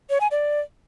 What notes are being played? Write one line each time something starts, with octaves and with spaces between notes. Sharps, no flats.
C#5
G#5
D5